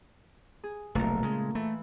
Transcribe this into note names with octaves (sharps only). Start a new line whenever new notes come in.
G#4
F1 B1 A#2 A3
C#3 G#3
E3 A3